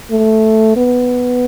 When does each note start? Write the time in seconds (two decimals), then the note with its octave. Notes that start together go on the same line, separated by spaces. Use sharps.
0.11 A3
0.77 B3